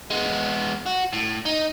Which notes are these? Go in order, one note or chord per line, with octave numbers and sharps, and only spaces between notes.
G#3 B3
F#4
A2
D#4